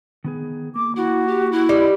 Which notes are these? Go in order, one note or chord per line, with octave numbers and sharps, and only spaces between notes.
D#3 B3 G#4
A#3 D6
E4 F#4
G4
E4
G3 D#5